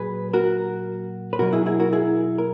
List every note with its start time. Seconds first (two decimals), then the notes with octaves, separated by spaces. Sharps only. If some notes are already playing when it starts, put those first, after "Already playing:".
Already playing: A#2 F#3 G#4 B4
0.33 F#4 A#4
1.33 B4
1.39 B2 F#3 F#4 A#4
1.53 E4 G#4
1.66 E4 G#4
1.80 F#4 A#4
1.92 E4 G#4
2.38 A#4